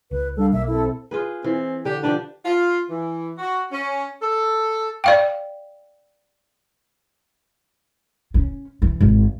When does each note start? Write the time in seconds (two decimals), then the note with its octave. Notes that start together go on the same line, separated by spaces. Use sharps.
0.11 C#2 B4
0.36 G3 D4 A4 F5
0.53 B1 A#3 E5
0.67 C4 E4 A4
1.11 F4 G#4 B4
1.44 E3 C4
1.85 D3 G4
2.03 F3 D4 G4 B4
2.45 F4
2.90 E3
3.38 F#4
3.72 C#4
4.22 A4
5.04 D5 F5 G5
8.34 C#4
8.82 E3
9.01 G#1